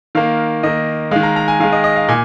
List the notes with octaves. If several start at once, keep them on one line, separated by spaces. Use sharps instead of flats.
D#3 A#3 F5
D#3 A#3 D#5
D#3 G#3 F5
A#5
A#5
G#5
D#3 G#3 F5
D#5
D#5
F5
A#2 G#5